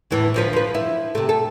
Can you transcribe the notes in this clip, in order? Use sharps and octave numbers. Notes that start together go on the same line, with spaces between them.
E2 A2 E3
D2 F3 B4
F3 B4
E4
C3 A3
A4